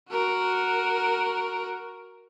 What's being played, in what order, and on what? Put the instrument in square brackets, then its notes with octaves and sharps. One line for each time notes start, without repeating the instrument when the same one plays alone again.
[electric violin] F#4 A#4